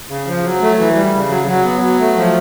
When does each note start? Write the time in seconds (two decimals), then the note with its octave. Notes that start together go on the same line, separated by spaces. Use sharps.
0.09 C#3
0.26 F3
0.44 F#3
0.61 A3
0.78 E3
0.95 G3
1.13 C#3
1.30 F#3
1.47 F#3
1.64 B3
1.81 F#3
1.99 A3
2.16 F3